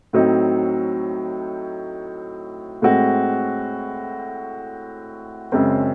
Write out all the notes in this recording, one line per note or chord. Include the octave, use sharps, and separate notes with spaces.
A2 F#3 C4 D#4
A2 G#3 C4 F#4
F#2 C#3 G#3 C4